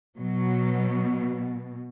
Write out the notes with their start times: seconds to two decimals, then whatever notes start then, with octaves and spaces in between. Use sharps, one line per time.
0.17 B2 F#3